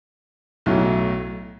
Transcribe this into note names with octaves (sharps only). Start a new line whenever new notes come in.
B1 A2 F#3 A3